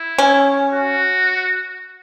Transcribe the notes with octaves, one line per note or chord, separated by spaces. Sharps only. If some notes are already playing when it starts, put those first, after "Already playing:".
Already playing: E4
C#4
F#4